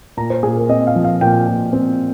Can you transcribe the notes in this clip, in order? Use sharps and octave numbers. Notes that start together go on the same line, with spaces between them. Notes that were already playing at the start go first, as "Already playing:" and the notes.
A#2 A#5
C5
A#2 G#4
A#4
C4 D#5
F5
F3
F5
A#2 G5
A#2
C4